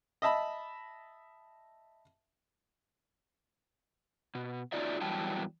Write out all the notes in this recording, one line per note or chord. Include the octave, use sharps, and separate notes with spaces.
D#5 E5 A5 B5
B2
D#4 F4 F#4 D5 E5
E2 E3 F#3 G3 G5 A5